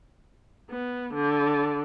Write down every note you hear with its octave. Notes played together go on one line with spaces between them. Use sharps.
B3
D3